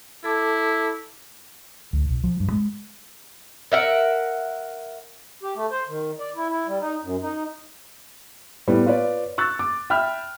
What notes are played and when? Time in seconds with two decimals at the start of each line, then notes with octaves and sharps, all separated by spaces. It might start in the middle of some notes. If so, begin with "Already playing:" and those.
0.24 E4 A4 A5 D6
1.93 D2
2.09 B1
2.24 F3
2.40 G2
2.52 G#3
3.72 A#4 E5 F#5
5.43 G4
5.56 A3
5.71 C5
5.88 D#3
6.20 D5
6.36 E4
6.49 E4
6.67 G3
6.80 D#4
7.03 F#2
7.22 D#4
8.68 A2 G3 B3
8.86 F4 B4 C#5 D5
9.38 C#6 E6 F#6 A6
9.59 D6
9.90 E5 G5 B5 F6